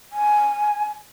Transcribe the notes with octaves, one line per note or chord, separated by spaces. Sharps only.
G#5